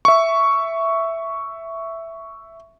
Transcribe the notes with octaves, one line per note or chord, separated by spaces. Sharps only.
E5 C#6